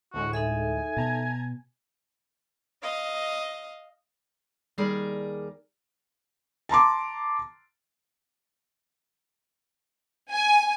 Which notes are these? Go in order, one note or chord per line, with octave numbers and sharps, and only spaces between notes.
D2 A2 G#3 F#4
D#4 A4 E5 G#5
B2 A5 A#5 G#6
D#5 F5
D#2 G3 G#4 A#4 D5
A5 A#5 C6 D6
G#5